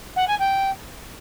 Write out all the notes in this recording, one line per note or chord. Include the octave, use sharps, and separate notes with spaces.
F#5
G#5
G5